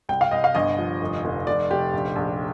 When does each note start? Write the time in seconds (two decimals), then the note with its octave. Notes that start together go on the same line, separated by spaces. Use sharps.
0.09 C2 G5
0.21 F5
0.31 C2 D#5
0.44 F5
0.55 G1 D#5
0.79 F3
1.01 F1
1.24 F1
1.47 F1 D5
1.70 F1 G4
1.93 A#1
2.16 A#1